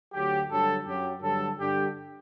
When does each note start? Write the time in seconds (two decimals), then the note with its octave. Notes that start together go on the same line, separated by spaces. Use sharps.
0.13 D2 D3 F#3 G4
0.49 G2 D3 F#3 A4
0.85 F#2 F#3 G4
1.21 G2 D3 F#3 A4
1.58 G2 D3 G3 G4